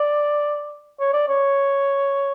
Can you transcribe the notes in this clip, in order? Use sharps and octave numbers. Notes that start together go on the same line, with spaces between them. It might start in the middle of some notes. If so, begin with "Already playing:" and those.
Already playing: D5
C#5
D5
C#5